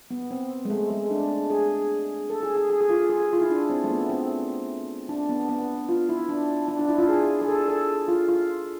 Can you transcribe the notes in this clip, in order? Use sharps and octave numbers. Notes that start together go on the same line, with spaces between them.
B3
C4
G#3
A3
G#3
D4
G#4
A4
G#4
G#4
G#4
G#4
F4
G#4
F4
E4
D4
C4
A3
B3
C4
D4
B3
B3
F4
E4
D4
D4
D4
E4
F4
G#4
G#4
A4
A4
F4
F4